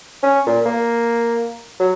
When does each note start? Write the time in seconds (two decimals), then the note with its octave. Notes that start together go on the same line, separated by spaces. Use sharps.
0.23 C#4
0.47 A#2
0.66 A#3
1.79 F#3